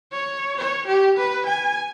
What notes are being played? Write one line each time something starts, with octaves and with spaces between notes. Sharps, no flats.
C#5
C#5
G4
B4
G#5